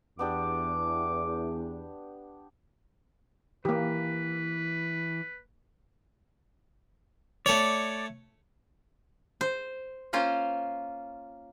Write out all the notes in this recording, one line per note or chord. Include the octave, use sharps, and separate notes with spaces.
E2 B3 D4 G4 D6
E3 A#3 G4 B4
A3 C#5 D5
C5
A#3 C#4 F4 C5